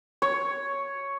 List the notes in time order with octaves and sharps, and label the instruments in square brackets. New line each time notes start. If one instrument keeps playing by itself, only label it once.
[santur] C#5